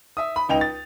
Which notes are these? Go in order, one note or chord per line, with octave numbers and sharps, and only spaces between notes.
E5 D#6
B5
C#2 D#4 G5 F7
A6